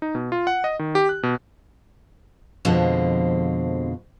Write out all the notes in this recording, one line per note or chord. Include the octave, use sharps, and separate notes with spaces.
D#4
B2
F4
F#5
D#5
D#3
G4
F#6
B2
F2 B2 D3 F3 G#3 C4